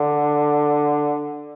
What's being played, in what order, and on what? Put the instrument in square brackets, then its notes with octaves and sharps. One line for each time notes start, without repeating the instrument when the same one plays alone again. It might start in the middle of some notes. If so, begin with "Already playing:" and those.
Already playing: [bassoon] D3